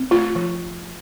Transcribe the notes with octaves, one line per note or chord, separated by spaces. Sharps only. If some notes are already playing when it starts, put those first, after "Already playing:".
Already playing: C4
A3 F4
F3